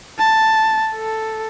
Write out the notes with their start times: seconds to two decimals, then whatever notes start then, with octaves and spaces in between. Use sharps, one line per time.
0.18 A5
0.95 A4